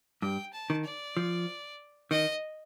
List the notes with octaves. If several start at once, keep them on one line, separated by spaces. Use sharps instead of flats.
G2 G5
A5
D#3
D5
F3
D#3 D#5